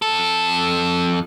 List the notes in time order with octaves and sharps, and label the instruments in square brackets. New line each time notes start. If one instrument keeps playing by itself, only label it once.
[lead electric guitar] F2 A4